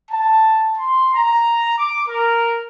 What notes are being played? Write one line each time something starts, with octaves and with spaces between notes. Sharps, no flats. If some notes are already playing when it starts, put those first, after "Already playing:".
A5
C6
A#5
D6
A#4